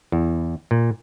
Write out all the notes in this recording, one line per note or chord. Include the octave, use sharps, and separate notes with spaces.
E2
A#2